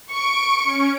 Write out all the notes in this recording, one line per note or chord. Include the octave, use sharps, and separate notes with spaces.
C#6 D7
C#4